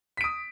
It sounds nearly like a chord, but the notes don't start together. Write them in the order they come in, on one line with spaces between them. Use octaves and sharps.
B6 D7 D#6